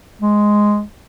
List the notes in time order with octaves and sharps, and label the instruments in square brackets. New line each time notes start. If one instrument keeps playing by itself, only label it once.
[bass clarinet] G#3